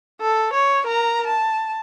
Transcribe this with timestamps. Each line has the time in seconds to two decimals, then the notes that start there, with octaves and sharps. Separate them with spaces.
0.21 A4
0.54 C#5
0.87 A#4 A#5
1.27 A5